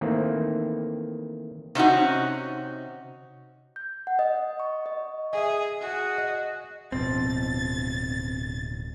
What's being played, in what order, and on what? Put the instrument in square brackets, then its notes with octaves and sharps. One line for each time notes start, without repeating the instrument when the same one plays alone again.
[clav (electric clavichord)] D#3 E3 A3 A#3 C4
[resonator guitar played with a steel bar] C3 C#4 D#4 F#4
[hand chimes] G6
F#5
D#5
C#6
D#5
[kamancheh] G#4 [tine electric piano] D#5 E5
[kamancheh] F#4 G#4
[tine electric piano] D#5
[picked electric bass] D1 B2 F3 [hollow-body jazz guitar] C4 [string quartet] A6